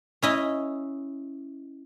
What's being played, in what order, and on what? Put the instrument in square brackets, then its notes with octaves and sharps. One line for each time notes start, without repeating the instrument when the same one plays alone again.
[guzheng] C#4 E4 D#5